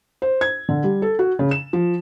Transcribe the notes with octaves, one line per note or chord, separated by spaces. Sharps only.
C5
G#6
D3
G3
A4
F#4
C#3
E7
F3